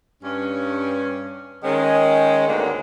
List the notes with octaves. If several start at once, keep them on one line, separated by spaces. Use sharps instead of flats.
G2 C#4
D#3 G#3 C#4
D2 G#2 D3 G#3 A#3 B3